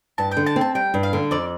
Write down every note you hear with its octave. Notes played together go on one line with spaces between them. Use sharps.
G2 A5
G5
D3
A5
C4
A5
G3 G5
G2
F5
D3
F2 D5